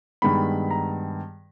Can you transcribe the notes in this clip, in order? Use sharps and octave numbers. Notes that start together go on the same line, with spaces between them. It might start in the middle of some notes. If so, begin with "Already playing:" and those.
G2 D#3 G#3 B3 B5
A#5